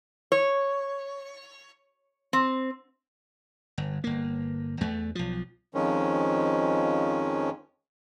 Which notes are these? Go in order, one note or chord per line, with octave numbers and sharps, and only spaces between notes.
C#5
C4
G1
G1 A#3
E2 A3
B1 F3
F2 D#3 F3 G#3 C#4